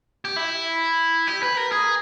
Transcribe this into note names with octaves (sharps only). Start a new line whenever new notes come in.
G4
E4
G4
B4
A#4
G#4